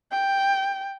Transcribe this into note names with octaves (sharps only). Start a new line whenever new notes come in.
G5